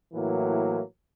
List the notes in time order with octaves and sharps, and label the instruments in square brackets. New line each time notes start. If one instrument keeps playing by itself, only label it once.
[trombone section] A2 E3 F#3 A#3